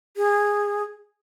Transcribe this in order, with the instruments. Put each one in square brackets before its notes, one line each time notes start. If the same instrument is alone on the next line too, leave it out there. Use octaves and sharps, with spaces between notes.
[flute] G#4